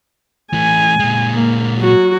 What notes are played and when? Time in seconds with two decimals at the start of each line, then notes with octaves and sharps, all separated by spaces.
0.53 E3 A3 G#5
0.99 A#2 G#3
1.34 A#3
1.78 F#3 F#4